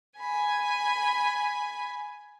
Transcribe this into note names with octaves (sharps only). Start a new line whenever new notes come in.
G#5 B5